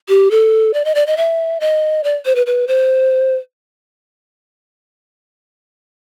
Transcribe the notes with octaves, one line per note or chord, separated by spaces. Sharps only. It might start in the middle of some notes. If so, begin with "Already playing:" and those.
G4
A4
D5
D#5
D5
D#5
E5
D#5
D5
C5
B4
B4
C5